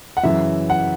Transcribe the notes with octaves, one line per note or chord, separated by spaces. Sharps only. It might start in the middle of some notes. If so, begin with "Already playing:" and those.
F#5
F#2 C#3 E3 E5
F#5